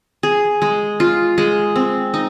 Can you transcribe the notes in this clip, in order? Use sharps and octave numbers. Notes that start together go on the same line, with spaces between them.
G#4
G#3
F4
G#3
C4
D#4